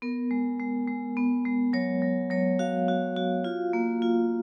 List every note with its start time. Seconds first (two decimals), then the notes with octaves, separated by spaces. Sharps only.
0.02 B3 A#4
0.31 G#3
0.59 G#3
0.88 G#3
1.17 B3
1.45 G#3
1.73 F#3 C#5
2.02 F#3
2.30 F#3 C#5
2.59 F#4 F5
2.88 F#4
3.16 F#4
3.44 F4
3.73 A#3
4.02 F4